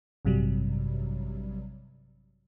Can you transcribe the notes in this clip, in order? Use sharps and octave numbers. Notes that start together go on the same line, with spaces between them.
A1 G2 C3 F#3 G3